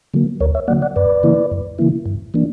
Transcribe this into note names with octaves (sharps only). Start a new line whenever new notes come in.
D3 F#3 A#3
D2 A#4 C#5
C#5 E5
D3 F#3 A#3 D5 F#5
D5 F#5
F#2 B4 D5
C#3 E3 A#3 E4
F#2
C#3 E3 A#3 E4
G2
E3 A#3 D4